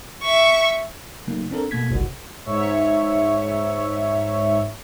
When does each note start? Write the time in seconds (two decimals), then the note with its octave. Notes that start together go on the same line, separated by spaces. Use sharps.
0.23 E5 C#6
1.27 C#3 F#3 A3 A#3 D#4
1.51 C4 D4 A4 A#4
1.71 B2 A3 A#3 G#6 B6
1.90 G1 C2 F#4
2.45 G#2 C#5 E5 C#6